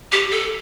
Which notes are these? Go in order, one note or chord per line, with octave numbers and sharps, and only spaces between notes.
G4
A4